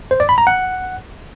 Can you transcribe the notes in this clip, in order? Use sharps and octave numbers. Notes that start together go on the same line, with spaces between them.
C5
D5
B5
A#5
F#5